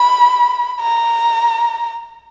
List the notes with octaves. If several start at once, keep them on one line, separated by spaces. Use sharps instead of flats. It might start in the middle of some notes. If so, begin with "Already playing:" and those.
Already playing: B5
A#5